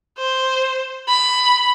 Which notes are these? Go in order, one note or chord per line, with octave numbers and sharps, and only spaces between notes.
C5
B5